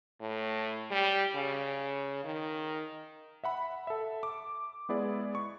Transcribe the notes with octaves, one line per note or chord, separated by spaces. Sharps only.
A2
G3
C#3
D#3
E5 F#5 B5
A4 E5
D6
G#3 B3 E4 G#4 D5
C#6